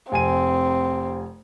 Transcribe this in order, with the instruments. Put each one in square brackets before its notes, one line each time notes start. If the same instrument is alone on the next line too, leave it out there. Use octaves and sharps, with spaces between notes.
[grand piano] F1 G#5 D#7 [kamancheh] C4